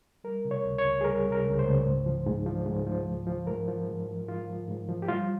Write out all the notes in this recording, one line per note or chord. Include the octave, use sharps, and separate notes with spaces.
G3 A#4
C3
C#5
C#2
C#5
C#2
G#4
G3 A#4
C3
A#4
C#2
C5
C#2
G#2
F3
G#2
F3
G#2
F3
G#2
F3
G#2 A#4
F3
G#2
F3
G#2 F4
F3
G#2
F3
G4
G3 F4